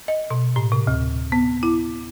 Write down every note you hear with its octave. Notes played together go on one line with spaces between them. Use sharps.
D#5
B2
A2
C3
D2
B3
E4